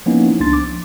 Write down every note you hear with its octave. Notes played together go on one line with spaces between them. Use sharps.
F3 A#3 B3 C#4 D#4 E4
C#2 F3 D4 C6 A6
D6